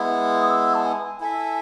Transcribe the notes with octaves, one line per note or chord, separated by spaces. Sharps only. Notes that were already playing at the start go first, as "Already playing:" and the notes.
Already playing: G#3 B3 E4
D#6
E6
A5
G#5
E4 A4 E5 G#5